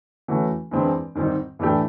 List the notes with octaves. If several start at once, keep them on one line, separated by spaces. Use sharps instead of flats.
E3 A3 C#4 F#4
G2 E3 G#3 C4
G#2 D#3 G3 C4 D#4
A2 E3 A3 D4 G4